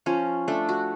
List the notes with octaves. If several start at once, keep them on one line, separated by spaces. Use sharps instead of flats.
F3 C#4
A3 D4
F#4